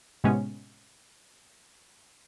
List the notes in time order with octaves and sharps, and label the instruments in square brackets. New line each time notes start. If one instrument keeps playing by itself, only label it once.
[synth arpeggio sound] A2 C3 G#3 B3 C#4